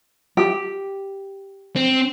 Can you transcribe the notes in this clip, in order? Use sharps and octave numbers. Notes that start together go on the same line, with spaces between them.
G4
C4